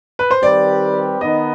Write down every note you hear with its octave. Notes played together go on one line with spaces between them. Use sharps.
B4
C5
D#3 G3 C4 G4 B4 D5
D#3 B3 D#4 B4 D#5